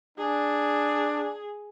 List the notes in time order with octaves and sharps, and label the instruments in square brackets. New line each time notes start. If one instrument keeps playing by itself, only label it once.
[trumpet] D4 [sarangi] G#4